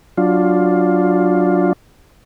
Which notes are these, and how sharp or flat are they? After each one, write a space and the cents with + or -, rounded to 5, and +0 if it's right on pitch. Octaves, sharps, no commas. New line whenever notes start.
F#3 +0 D4 +0 F4 +10